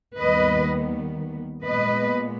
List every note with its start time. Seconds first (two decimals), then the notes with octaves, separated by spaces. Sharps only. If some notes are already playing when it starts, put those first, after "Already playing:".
0.18 D#2 D#3 G3 B3 B4 D#5
1.64 A#2 G#3 B3 B4 D#5